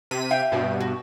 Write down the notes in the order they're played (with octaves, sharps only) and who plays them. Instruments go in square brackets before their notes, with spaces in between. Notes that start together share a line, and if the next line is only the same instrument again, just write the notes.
[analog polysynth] C3 B6 D#7
[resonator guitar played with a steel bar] E5 F5 G5
[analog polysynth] G2 B2
[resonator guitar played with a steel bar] F#4